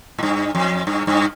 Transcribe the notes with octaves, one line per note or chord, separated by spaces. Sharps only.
A2
G2
F2
G2
G2